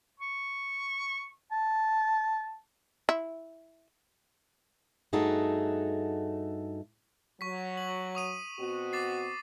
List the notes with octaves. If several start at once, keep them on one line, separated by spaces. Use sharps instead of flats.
C#6
A5
E4
G2 A3 D#4 F#4 G#4 A4
F#3 C#6 B6
F#7
C#6 D#6 D#7
B2 C4 F#4
D6 A6 C7